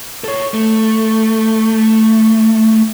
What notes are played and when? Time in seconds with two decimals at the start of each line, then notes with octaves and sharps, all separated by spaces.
0.24 A4 C#5
0.54 A3